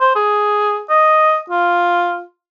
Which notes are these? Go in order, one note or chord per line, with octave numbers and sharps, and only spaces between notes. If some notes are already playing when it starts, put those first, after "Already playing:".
C5
G#4
D#5
F4